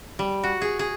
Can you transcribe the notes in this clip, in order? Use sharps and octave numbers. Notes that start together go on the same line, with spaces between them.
G3
F#4
G#4
G#4